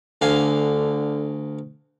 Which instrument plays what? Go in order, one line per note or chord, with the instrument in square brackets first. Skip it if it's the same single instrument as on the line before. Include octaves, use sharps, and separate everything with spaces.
[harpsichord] D2 F5 G#5 [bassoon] D3